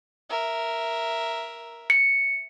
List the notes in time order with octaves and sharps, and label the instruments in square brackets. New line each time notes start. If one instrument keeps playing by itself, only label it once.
[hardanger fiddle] A#4 E5
[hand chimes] C#7